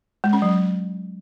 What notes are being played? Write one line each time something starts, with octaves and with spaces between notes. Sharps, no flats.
G#3
C#4
F#3